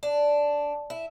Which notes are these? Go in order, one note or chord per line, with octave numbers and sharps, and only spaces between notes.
D4
E4